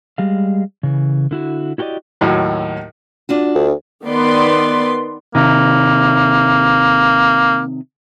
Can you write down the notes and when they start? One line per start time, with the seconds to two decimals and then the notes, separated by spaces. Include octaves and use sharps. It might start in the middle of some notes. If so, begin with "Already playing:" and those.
0.18 G3 G#3 F5
0.83 C#3 E3
1.31 D3 E4 F#4
1.78 E4 F#4 G4 A#4 D5 D#5
2.21 D#2 A2 F#3
3.29 D4 F4 F#4
3.55 D2
4.04 D#3 B3 B4 D5 C6
5.35 C3 D#3 A#3